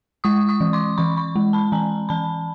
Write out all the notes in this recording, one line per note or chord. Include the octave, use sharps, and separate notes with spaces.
G#3 C#6 D#6
C#6 D#6
E3
C6 D6
E3 B5 C#6
B5 C#6
G#3
A5 B5
E3 G#5 A#5
E3 A5 B5